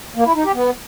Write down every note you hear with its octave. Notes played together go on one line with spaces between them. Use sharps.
A#3
E4
D#4
G4
B3